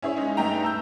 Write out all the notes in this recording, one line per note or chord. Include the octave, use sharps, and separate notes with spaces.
C#4 E4 G#4 C#5
G#3 C#4 D#4
G2 A3 D#4 G5 A#5
A5 E6 G6